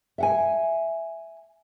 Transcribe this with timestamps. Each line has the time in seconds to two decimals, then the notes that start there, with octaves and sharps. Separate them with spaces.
0.18 E5 F#5 G#5